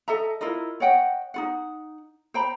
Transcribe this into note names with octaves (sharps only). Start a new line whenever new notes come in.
A4 D#5 E5 A#5
E4 F4 A#4 D#5
C#5 D#5 F#5 G5
D#4 F4 F#5
C5 G5 A#5 B5